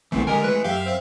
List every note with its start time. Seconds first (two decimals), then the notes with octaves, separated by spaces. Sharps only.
0.12 A#1 E3 A3 C4 E4
0.27 D3 G#3 G4 A#4 D#5 G#5
0.44 E3 G#3 A3 B4
0.64 F#2 G4 E5 F5
0.86 C4